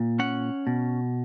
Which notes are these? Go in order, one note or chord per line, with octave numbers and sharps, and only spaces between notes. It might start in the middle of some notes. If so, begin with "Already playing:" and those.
Already playing: A#2
C#4 F#5
B2